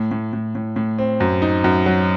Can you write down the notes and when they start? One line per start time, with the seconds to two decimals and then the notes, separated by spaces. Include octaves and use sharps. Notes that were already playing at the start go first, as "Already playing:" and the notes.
Already playing: A2
0.11 A2
0.33 A2
0.55 A2
0.76 A2
0.98 C4
1.20 F#2
1.42 D#4
1.64 F#2
1.86 F#3